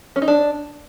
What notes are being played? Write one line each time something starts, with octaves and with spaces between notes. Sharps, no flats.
C#4
D#4
D4